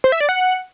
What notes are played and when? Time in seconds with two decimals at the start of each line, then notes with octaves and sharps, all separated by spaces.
0.04 C5
0.12 E5
0.20 D5
0.29 F#5